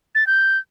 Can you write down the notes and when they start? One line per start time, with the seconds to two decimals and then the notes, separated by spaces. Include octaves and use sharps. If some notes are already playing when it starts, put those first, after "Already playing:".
0.15 A6
0.27 G6